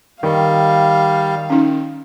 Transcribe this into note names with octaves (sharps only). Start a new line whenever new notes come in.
D#3 G3 F5
C#4 D#4